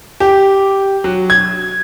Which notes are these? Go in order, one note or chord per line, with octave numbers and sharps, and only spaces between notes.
G4
F#3
G#6